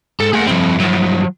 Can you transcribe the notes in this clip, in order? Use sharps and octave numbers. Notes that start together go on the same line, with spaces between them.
G#2 A4
A3 A#3 G#4 F#5
G2 F3 C4 E4
F3 F#3